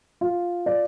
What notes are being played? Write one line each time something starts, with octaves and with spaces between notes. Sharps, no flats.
F4
D5